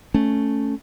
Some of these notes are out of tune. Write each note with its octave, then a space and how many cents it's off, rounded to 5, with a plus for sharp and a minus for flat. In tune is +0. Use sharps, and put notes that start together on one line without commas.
A3 +0 C#4 +0